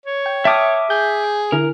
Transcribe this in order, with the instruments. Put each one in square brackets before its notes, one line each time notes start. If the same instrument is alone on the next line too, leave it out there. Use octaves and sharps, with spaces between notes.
[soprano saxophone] C#5
[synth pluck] G5
[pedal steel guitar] E5 D6 D#6 [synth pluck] G5 A5 F6
[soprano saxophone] G#4 [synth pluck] G6
[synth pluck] D3 E4 [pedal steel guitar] A#4